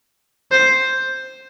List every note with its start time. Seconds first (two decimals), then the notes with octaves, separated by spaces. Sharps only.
0.52 C5